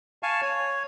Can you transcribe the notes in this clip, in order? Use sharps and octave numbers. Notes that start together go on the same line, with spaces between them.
F5 G#5 A5 C#6
C#5